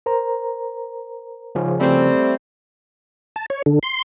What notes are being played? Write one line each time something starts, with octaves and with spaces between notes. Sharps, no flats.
A#4 C5 A#5
G#2 C#3 F3 C#4
G3 A3 C4
A5
C#5
D3
C6